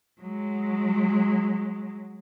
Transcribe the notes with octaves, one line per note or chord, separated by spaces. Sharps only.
F#3 G#3